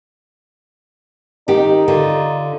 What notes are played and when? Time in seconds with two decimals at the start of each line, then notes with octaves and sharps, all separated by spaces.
1.48 D#3 D#4 G4
1.88 D3 F4